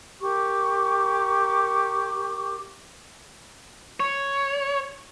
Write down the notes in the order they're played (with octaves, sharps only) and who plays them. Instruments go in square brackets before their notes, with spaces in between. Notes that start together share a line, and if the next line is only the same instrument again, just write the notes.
[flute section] G4 A#4 C#6 D6
[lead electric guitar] C#5